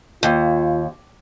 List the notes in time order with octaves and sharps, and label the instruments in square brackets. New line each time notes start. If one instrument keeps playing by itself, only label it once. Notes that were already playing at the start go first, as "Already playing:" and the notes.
[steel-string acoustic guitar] D#2 [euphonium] F4